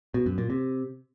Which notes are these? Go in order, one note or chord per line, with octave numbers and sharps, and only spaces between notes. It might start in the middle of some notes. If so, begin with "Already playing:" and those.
B2
F#2
A#2
C3